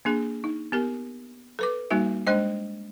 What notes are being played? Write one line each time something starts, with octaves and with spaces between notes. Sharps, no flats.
A#3 D4 G#4
D#4
B3 G4 A#4
A4 B4 D6
G3 A#3 D#4 F#4 E5
G#3 D4 C5 D#5